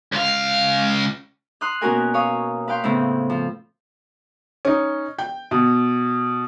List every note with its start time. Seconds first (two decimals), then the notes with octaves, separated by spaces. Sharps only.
0.12 C#2 F5
1.61 C6 D#6 F6 F#6
1.81 B2 A#3 C#4 F#4 A#4 G#5
2.14 C#5 F5 D#6
2.68 B4 F5 G5 C6
2.84 A2 C#3 B3 C4 E4
3.30 F3
4.65 C#4 D#4
5.18 G5
5.51 B2